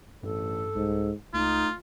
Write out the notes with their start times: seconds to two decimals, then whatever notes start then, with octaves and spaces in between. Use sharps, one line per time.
0.23 A1 G2 A4
0.75 C2 G#2
1.34 C#2 A3 D#4 F4